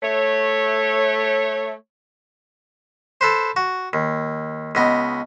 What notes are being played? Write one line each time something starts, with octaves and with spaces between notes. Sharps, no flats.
A3 C#5
A4 B4 C5
F#4
D#2
C#2 B3 D#5